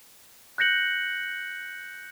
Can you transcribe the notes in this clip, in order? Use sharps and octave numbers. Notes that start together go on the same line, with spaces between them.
F#6 G6 A#6 C#7 F#7